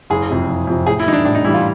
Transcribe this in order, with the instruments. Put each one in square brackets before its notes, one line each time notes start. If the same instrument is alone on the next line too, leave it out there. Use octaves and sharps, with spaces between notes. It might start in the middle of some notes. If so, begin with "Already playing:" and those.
[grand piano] F#1 [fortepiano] G#4
[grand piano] F2 C3
F#1
F2 C3
[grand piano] A2 [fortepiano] G#4
[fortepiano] E4
[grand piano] E3 G3 [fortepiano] D#4
[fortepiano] D4
[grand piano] A2 [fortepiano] D4
[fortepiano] D#4
[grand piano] E3 G3 [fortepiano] E4
[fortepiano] F4